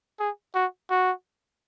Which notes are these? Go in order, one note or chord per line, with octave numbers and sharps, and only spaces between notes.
G#4
F#4
F#4